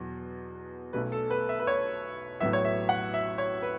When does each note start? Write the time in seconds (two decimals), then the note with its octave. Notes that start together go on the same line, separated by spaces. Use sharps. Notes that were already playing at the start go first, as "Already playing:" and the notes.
Already playing: E2 B2 F#3
0.93 B1 B2 A3 C#4 B4
1.12 A4
1.30 B4
1.49 E5
1.60 B4
1.67 C#5
2.40 A1 A2 F#3 B3 E5
2.53 C#5
2.65 E5
2.89 F#5
3.14 E5
3.38 C#5
3.63 B4